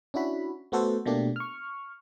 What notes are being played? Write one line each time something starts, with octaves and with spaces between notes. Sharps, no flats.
C#4 D4 E4 F#4 B5
A3 B3 F#4 A4 C5
B2 A3 A#3 D4 G4
C#6 F6